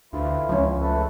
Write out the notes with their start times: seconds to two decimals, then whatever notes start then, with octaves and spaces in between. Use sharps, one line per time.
0.13 D2 E3 E4 F4
0.49 C#2 F3 C#4
0.82 A3 A4 B4